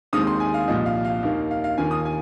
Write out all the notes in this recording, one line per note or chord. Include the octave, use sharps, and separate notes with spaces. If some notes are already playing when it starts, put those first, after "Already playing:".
D#2 D#3 G#3 C4 D#6
C6
G#5
F5
C2 A#2 F3 D#5
F5
F5
D#2 D#3 A#3 D#4 F5
F5
F5
D#2 D#3 A#3 F4 G#5
D#6
G#5